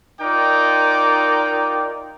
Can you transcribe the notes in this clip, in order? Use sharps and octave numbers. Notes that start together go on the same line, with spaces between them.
D#4 F4 A#4 D5 G5 D6